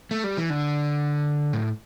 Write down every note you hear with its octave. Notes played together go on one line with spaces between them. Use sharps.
A3
G3
E3
D3
A2